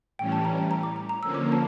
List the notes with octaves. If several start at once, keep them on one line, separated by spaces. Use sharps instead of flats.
A2 E3 G3 C#4 G5
A5
A#5
G5
A#5
D6
A#5
A#5
D3 F3 A#3 C#4 E6
D6
A5